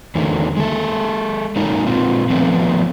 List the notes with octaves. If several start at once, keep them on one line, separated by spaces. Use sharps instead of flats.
E2 D3 D#3 A3
G#3 A4
F#3 G#3 A#3 D#4 A#4
A#2 C4 F4
F3 A3 B3 C4